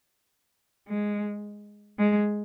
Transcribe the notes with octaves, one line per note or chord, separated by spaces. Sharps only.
G#3
G#3